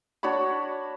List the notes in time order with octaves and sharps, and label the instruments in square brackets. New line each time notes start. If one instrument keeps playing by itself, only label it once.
[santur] D4 F#4 C#5 B5